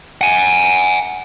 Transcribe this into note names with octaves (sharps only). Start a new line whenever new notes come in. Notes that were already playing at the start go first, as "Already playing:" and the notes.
F#5 G#5